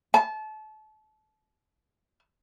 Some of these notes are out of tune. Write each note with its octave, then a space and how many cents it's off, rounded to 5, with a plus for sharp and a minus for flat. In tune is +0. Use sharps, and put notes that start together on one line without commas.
A5 -30